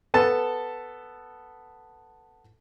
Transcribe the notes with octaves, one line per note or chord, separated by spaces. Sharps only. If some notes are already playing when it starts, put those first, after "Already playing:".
B3 A4 A5